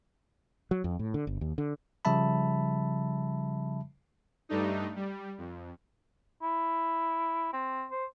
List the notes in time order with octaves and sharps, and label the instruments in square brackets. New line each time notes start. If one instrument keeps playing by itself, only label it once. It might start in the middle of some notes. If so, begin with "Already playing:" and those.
[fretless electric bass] F#3
F2
A2
D3
G1
D#2
D3
[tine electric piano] C#3 F3 G3 E5 A5 B5
[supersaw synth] G2 G3 A3 D4 D#4
G3
F2
[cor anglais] E4
C4
C5